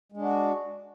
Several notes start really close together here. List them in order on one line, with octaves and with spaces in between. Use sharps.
G#3 D4 F#4